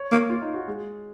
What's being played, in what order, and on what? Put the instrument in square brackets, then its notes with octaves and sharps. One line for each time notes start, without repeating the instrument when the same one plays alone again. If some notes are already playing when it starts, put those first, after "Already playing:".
Already playing: [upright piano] C#5
[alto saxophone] A#3
[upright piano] F4
D#4
F#4
G#3